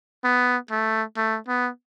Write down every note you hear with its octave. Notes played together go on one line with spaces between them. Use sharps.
B3
A3
A3
B3